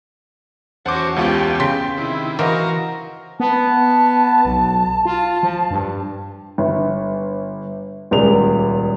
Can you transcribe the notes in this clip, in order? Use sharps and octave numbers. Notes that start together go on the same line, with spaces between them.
E2 C#4 F#4 C5 F#5 A5 D6
C#2 B3 F4 G4 G5
C#3 C6 B6
C3 D#3 E4
E3 F#4 A#4 C5 D#5 F5 A#5
B3 A5
B1
F4 A5
F3
G2
G1
D#1 C#2 G#4 D5 F7